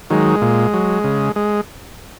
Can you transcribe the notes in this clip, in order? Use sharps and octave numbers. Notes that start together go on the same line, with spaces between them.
D#3 F#3 G#3
A#2
F#3
C#3
G#3